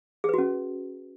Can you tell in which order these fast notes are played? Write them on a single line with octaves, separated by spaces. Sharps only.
G#4 B4 F#4 C#4